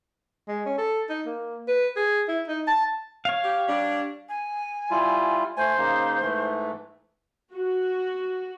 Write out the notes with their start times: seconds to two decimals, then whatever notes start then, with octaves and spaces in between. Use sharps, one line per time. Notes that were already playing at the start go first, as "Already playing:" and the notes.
0.48 G#3
0.65 C#4
0.78 A4
1.09 D#4
1.26 A#3
1.68 B4
1.96 G#4
2.28 E4
2.48 D#4
2.67 A5
3.25 C#5 F5
3.44 G4
3.68 G3 D4
4.29 G#5
4.91 G3 E4 F4
5.57 A3 C5 G#5
5.78 C#3 A#3 D#4
6.21 G#2 E3 A3
7.54 F#4